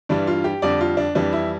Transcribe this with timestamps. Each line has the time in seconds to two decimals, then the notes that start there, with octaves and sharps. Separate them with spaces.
0.09 G2 E3 G3 D4
0.27 F4
0.44 G4
0.62 F2 D3 G3 D5
0.81 F4
0.97 D4
1.15 F2 E3 G3 D4
1.32 E4